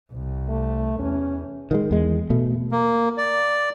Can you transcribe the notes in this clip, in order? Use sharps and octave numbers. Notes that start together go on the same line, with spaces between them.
C2
A3
E2 C#4
D#3 F3 G#3
E2 G#3
B2 A3
A#3
D5